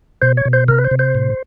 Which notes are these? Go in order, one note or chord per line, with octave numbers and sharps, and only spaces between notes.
B2 C5
C#5
B2
C5
C3 A#4
B4
C5
C3
C5
A2